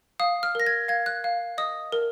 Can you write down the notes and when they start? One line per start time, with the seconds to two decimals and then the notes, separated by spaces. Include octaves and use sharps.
0.20 F5 D#6
0.43 F6
0.55 A#4 A#6
0.67 G#6
0.88 F5 G#6
1.06 F#6
1.24 F5
1.58 D#5 D#6
1.92 A#4